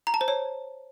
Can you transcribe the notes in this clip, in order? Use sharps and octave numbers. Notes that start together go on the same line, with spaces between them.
A#5
A5
C5
C#5